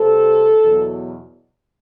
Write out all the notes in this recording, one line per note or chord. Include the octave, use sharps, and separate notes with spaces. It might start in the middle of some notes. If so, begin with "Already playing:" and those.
Already playing: C3 G3 C4 A4
E2 B2 F#3 B3